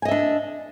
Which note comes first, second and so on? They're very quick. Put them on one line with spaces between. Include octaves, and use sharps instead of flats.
G#5 D#5 E5 D4